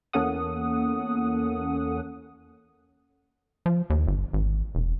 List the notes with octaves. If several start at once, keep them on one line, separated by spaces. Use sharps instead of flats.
E2 A#3 C#4 A4 F#5 D#6
F3
D#2
G1
G#1
E1